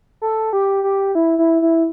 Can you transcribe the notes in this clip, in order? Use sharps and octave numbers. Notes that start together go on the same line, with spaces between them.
A4
G4
G4
E4
E4
E4